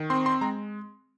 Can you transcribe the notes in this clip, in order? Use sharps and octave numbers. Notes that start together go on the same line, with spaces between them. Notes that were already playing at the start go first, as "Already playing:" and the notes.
Already playing: D#3
C4 C6
C6
G#3 A#5